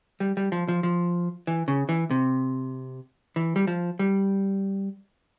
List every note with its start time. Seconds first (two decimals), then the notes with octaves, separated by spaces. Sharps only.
0.20 G3
0.37 G3
0.52 F3
0.68 F3
0.83 F3
1.47 E3
1.68 C#3
1.89 E3
2.11 C3
3.36 E3
3.56 G3
3.67 F3
3.99 G3